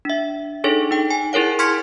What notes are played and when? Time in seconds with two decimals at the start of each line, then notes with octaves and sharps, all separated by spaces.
0.05 D4 E5
0.64 D4 D#4 G#4 A4 C#5
0.91 D#4 G5
1.11 G#5
1.33 E4 G#4 A#4 C#5 F#5
1.59 C6 C#6 F6 G#6 B6 C#7